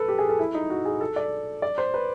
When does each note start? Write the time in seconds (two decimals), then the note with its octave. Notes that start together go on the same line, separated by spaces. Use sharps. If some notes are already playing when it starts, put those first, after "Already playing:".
Already playing: A4 B4
0.08 G4
0.19 G#4
0.29 A4
0.39 E4
0.54 D#4
0.70 F#4
0.85 G#4
1.01 A4
1.16 D5
1.62 D5
1.78 C5
1.94 B4